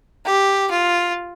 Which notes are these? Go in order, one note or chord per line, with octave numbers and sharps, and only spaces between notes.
G4
F4